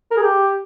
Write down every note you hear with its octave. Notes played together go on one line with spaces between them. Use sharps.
A#4
G#4
G4